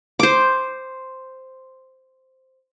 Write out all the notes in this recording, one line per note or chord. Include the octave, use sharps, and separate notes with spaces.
C5 D6